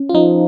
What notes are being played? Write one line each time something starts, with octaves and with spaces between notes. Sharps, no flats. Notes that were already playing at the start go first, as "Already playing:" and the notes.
Already playing: C#4
F4
F3 D#4